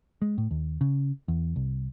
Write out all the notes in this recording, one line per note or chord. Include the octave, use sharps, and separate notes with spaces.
G#3
A2
D#2
C#3
E2
C2